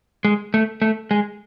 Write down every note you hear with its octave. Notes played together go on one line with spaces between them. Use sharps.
G#3
A3
A3
G#3